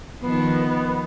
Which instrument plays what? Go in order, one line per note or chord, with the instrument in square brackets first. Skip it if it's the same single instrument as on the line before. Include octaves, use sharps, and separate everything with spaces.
[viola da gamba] D#3 F3 [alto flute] B3